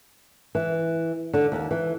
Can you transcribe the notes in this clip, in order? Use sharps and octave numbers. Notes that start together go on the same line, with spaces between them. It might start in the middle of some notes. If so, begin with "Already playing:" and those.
E3
D3
D#2
E3